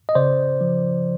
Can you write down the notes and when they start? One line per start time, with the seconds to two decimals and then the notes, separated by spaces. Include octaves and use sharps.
0.09 D#5
0.15 C#3 C5 D5
0.61 F3